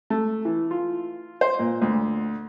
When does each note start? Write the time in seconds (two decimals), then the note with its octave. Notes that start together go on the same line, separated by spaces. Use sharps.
0.10 A3
0.45 E3
0.71 F4
1.41 C5
1.59 A#2
1.82 D2